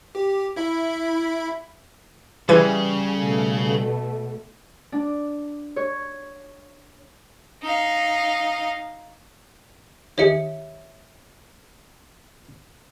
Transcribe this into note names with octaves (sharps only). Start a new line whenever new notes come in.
G4
E4 E5 B5
C#3 E3 G3 G#4 G#6 D#7
B2 A3
D4
C#5
D#4 F5
D#3 G4 G#4 C#5 E5 C#7